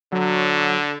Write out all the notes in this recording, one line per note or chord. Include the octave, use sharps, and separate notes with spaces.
D3 F#3